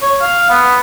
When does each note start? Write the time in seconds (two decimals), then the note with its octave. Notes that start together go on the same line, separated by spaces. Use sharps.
0.02 C#5
0.21 F5
0.49 B3